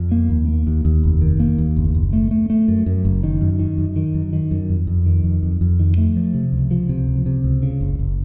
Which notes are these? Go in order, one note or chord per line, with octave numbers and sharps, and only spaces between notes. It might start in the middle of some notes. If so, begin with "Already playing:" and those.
Already playing: F2
A#3
D#2
A#3
D#2
D#2
F1
D#3
A#3
D#2
F#1
F#1
A3
A3
A3
F#2
F#2
F#1
D#3
F#2
D#3
F#2
D#3
F#2
D#3
F#2
F2
F2
D#3
F2
F2
F2
D#3
A3
F3
C3
C#2
F3
C3
C#2
C3
C#2
C#3
F#1
F#1